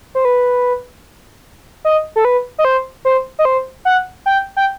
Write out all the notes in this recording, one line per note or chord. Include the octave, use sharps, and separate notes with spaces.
C5
B4
D#5
A4
B4
D#5
C5
C5
D#5
C5
F#5
G5
G5